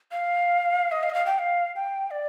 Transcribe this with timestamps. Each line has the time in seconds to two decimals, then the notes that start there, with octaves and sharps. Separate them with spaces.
0.11 F5
0.92 D#5
1.03 F5
1.10 D#5
1.14 F5
1.26 G5
1.39 F5
1.75 G5
2.11 D5